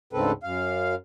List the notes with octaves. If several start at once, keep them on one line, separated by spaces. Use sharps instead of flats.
D2 G#2 C#3 C4 A4 B4
F#2 F5